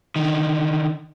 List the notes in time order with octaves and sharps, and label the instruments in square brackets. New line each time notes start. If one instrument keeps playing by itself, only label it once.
[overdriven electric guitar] D3 D#3